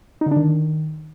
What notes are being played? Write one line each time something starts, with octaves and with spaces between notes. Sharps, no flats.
D#4
D3
D4
D#3